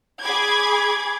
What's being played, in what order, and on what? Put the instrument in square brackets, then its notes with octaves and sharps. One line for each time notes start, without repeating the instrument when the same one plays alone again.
[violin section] G#4 B5 D6 G#6